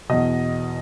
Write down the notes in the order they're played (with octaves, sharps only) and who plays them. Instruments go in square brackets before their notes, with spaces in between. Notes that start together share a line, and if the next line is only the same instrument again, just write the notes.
[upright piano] E2 B2 D#5